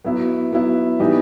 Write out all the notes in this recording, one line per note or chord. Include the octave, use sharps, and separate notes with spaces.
F#3 B3 E4
F#3 B3 E4
E3 G3 B3 D#4 G4